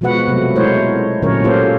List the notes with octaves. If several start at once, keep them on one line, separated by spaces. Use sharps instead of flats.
B2 F3 G#3 F#4 B4 F#5
C3 F#3 A3
G#3 A3 E4 A#4 C5 C#5
A#2 D3 F#3 C#4 A#4 C#5
A#3 F4 G4 A4 C5